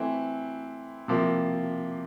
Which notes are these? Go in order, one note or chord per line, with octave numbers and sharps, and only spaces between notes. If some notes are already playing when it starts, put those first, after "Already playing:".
Already playing: E3 A3 C4 E4
C3 F3 A#3 E4